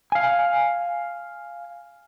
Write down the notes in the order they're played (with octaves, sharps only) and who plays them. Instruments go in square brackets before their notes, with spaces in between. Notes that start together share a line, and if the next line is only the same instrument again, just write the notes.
[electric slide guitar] F5 G#5